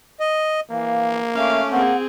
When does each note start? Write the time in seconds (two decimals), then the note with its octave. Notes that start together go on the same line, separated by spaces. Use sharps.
0.20 D#5
0.71 E3 A#3 F5
1.35 A3 C#4 E5 F5 D6
1.72 A#3 C4 G#4 F#5